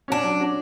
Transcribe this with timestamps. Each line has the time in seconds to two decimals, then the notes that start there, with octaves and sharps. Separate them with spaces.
0.08 C#4 D4 F#4
0.24 F#3
0.39 C#4 F#4